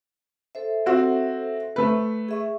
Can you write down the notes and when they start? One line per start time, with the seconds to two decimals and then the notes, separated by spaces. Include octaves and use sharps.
0.55 A4 C5 E5
0.86 C4 F#4
1.76 A3 B4
2.29 G#4 E5 C#6